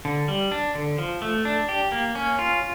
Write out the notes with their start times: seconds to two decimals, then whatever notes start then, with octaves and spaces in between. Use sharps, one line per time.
0.05 D3
0.28 G3
0.52 D4
0.75 D3
0.98 F3
1.22 A3
1.45 D4
1.69 G4
1.92 A#3
2.15 C#4
2.39 F4